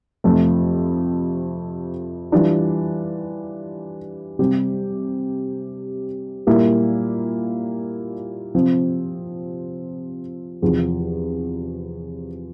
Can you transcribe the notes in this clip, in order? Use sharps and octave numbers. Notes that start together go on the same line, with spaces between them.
F2 C3 F3 A3
E3 G3 D4 F4
C3 G3 C4 G4
A#2 G3 A#3 E4
C3 F3 C4
E2 C3 F3